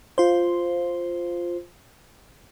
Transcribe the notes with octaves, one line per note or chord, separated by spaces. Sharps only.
F4 C5